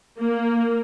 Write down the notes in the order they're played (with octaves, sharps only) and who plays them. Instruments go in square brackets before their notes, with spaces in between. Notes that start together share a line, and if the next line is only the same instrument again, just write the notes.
[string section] A#3